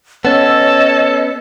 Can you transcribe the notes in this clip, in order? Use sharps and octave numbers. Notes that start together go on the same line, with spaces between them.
B3 C#4 A4 C#5 D#5 E6